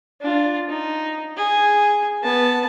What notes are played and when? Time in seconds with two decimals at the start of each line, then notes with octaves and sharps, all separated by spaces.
0.22 D4 F4
0.69 D#4
1.37 G#4
2.23 B3 A5